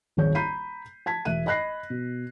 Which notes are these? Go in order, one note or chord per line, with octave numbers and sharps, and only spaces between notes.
D#1 G#1 G#4 C#5 G6
A#5 B5 G6 B6 C7 D#7
A5 G#6 B6
E1 E5 F#6 D#7
D#5 B5 F#6 A#6 C7
B2